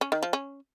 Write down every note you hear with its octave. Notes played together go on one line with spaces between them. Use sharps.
C#4
D#3
F3
C#4